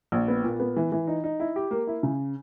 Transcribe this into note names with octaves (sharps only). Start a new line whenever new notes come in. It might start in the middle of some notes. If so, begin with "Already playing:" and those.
A#1
B3
A#2
B3
E3
E3
D#4
D#4
E4
G4
A#3
E4
C#3